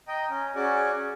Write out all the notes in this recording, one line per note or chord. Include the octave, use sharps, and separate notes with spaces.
D#5 G5 A#5
C#4
C#4 F#4 G#4 D5